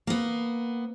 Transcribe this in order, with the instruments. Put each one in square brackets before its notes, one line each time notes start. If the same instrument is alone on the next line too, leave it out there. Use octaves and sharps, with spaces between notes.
[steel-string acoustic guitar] A#3 B3